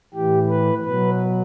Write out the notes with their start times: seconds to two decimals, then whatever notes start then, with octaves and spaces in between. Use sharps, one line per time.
0.14 A2 E3 G4
0.50 B4
0.85 B2 F#3 B4